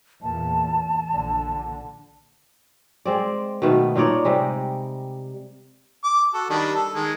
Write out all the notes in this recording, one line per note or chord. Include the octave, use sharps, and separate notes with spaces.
E2 A#2 A5
A#1 D3
G#3 C4 D5
B2 D#3 A3 B3
A#2 D#4 C#5 D5
C3 G3 G#3
D6
F#4 A4
D#3 G3 D4
A4
D#3 G#3